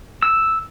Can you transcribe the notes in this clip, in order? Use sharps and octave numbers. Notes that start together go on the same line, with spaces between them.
E6